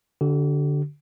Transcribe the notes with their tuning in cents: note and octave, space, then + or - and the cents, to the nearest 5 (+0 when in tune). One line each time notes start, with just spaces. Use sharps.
D3 -10 G4 -45